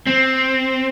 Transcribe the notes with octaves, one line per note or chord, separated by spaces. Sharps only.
C4